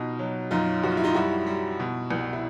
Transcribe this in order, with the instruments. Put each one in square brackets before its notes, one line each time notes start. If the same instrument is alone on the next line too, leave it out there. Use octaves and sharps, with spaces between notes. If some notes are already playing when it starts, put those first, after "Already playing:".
Already playing: [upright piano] B2 D#4 F4
F#3
F#2 D#4 F4
F#2 F#4
F4
E4
D#4 F4
G3 E4 F#4
G3
B2
C2
E4